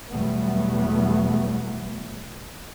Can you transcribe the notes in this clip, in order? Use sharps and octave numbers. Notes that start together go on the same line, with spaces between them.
E2 B2 F#3 G3 A3 B3